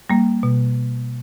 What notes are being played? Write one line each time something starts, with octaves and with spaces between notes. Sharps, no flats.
G3 A#3
B2